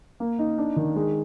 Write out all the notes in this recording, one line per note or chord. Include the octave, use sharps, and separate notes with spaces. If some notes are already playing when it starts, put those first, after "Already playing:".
A#3
D#4
D4
D#3
G#3